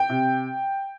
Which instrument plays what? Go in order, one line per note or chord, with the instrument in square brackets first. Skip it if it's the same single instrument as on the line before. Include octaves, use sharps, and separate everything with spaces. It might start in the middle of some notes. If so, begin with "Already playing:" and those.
Already playing: [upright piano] G5
C3